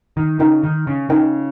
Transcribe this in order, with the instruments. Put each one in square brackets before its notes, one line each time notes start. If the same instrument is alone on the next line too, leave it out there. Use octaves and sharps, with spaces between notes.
[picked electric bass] D#3
[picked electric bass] C#3 [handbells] D#4 A#4 D#5 G5
[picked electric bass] D#3
C#3
[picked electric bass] C#3 [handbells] D#4 A#4 D#5 G5